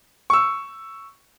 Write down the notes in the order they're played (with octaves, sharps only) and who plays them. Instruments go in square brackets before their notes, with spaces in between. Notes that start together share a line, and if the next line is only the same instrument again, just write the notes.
[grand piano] C#6 E6